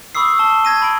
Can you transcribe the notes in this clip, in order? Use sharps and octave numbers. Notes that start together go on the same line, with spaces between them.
B5 C#6 D#6 E6 C7
A5 G7
G#6 A#6 D#7
B5 D7